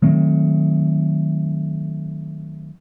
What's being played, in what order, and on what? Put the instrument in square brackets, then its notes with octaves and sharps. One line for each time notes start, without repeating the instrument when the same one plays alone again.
[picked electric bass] D#3 F#3 A3 C4